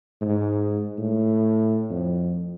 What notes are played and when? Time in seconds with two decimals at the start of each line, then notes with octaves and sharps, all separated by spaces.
0.21 G#2
0.98 A2
1.90 F2